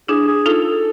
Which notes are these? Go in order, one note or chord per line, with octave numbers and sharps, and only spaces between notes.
D4 E4 G#4
G#4
D#4 F4 A4
A4